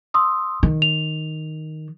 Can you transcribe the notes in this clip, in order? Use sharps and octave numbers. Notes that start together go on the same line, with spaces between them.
C6 D#6 E6
D#3
F7